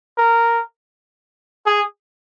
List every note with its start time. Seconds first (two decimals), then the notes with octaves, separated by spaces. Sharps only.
0.18 A#4
1.67 G#4